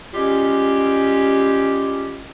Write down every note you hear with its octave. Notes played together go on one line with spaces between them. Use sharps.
G3 G#3 C#4 F4 G4